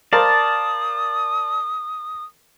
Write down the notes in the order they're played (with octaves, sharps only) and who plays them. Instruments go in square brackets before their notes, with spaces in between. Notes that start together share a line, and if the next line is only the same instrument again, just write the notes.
[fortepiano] A#4 C5 F5 [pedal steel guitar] D5 A5 [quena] D#6